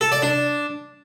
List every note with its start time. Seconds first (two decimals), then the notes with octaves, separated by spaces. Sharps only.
0.01 A4
0.12 D5
0.22 D4